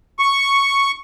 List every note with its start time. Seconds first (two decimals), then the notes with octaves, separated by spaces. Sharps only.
0.19 C#6